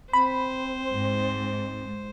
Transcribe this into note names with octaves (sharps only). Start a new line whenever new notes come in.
C4 C5 B5
G#2